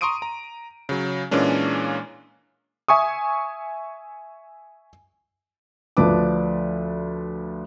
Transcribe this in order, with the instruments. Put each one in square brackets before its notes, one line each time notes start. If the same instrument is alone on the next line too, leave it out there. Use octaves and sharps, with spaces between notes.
[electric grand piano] A#5 C6 C#6 D#6 D7 D#7
A#5
C#3 F#3
A#2 E3 G#3 A#3 C#4 D4
E5 G#5 C#6 D#6
[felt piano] D2 F3 D4 B4 A5 D6